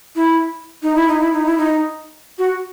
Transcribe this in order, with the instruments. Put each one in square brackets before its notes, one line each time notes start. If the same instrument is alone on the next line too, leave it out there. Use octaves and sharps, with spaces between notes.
[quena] E4
D#4
E4
D#4
E4
D#4
E4
D#4
F#4